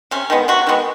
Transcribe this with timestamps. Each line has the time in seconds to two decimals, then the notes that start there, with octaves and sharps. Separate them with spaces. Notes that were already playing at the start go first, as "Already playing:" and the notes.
0.11 C3 C#4
0.30 D#3 G#3 B3
0.48 C3 F#4
0.67 D#3 G#3 B3